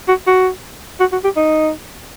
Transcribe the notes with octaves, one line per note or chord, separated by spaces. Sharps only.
F#4
F#4
F#4
F#4
G4
D#4